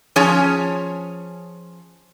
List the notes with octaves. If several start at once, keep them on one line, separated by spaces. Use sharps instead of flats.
F3 C#4 G#4 C#5